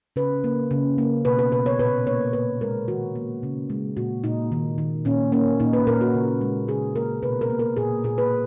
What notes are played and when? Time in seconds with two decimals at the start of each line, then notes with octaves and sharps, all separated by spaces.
0.16 C#3 B4
0.44 A#3
0.71 C#3
0.98 A#3
1.25 B2 B4
1.39 B4
1.52 B2 B4
1.66 C#5
1.79 A#2 B4
2.07 A#3 C#5
2.33 A#2 B4
2.61 G#3 A#4
2.88 D#3 F#4
3.15 A#3
3.43 C#3
3.70 G#3
3.97 A#2 F#4
4.24 A#2 D#4
4.52 D#3
4.78 D#3
5.05 A#2 C#4
5.32 A#3 C#4
5.60 A#2 D#4
5.73 B4
5.87 A#2 A#4
6.01 F#4
6.15 C#3
6.41 G#3
6.68 C#3 G#4
6.95 A#3 A#4
7.23 B2 B4
7.41 A#4
7.50 A#3
7.59 A#4
7.77 A#2 G#4
8.04 A#2 G#4
8.18 B4